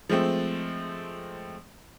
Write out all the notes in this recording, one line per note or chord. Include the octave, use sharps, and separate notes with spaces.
F3 G#3 A3 C4